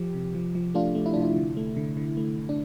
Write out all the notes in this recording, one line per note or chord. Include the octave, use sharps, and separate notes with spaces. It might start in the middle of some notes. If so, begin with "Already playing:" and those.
Already playing: F3 G4
C3
F3
F3
A3 D4 F4
A3
E4
C3 D4
E4
D3
A3
D3
D3
A3
D3
D4